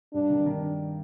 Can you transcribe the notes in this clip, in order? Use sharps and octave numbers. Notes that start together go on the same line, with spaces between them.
G2 D4
D#3
D#3